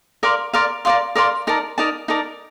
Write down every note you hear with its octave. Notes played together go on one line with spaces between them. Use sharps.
A#4 D5 F5 C6
A#4 D5 F5 C6
A#4 D5 F5 C6
A#4 D5 F5 C6
D#4 A#4 D5 A5
D#4 A#4 D5 A5
D#4 A#4 D5 A5